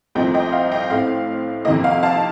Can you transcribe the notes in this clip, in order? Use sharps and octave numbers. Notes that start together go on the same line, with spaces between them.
C2 A#2 F3 A3 C4 D#5 G5
D#5 G5
F5
D#5 G5
A2 A3 C4 F5
F2 C3 D#3 A#3 D#5
F5
F5 A5